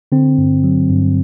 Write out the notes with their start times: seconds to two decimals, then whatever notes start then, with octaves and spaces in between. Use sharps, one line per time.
0.12 D3 C4
0.38 G2
0.64 F#3
0.90 G2